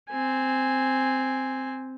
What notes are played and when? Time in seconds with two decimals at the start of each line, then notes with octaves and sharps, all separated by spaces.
0.10 C4 G#5